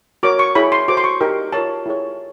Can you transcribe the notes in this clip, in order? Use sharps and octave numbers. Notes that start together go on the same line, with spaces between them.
F#4 A#4 C#5 D6
C#6
E4 G#4 C#5 B5
C6
F#4 A4 C5 D6
C6
C#6
D#4 G4 A#4
F4 A#4 C#5 A5
E4 G#4 C#5